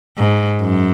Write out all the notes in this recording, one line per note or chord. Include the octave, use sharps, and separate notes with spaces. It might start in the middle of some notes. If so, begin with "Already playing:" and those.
G#2
F#2